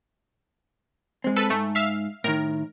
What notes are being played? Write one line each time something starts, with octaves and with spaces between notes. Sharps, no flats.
G#3 C4
A4 B4
G#2 A3
E5 F5
A2 D#3 A#4